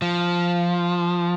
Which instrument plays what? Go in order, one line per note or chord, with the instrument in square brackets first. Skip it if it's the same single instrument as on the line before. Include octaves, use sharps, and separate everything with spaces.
[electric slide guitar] F3